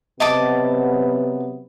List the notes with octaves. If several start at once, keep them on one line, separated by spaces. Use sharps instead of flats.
C3 F#3 B3 D#5 A5 D6